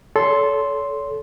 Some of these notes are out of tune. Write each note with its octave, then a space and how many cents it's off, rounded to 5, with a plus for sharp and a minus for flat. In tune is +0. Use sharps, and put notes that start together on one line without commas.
A4 -15 C#5 +35 C6 +0